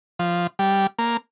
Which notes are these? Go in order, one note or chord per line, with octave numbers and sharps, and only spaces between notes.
F3
G3
A#3